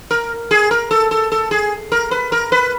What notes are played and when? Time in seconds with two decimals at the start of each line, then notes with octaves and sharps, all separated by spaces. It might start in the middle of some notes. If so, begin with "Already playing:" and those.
0.11 A#4
0.51 G#4
0.71 A#4
0.91 A4
1.11 A4
1.32 A4
1.51 G#4
1.92 A#4
2.11 B4
2.32 A#4
2.52 B4